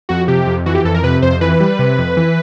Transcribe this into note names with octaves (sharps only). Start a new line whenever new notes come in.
F2 F#4
C3 G4
F2
E3 F#4
G4
F2 A4
A#4
C3 B4
F2 C5
E3 B4
G3
C3
F2
E3